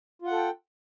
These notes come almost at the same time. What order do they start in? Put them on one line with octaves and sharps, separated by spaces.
F4 F#5 A4 G5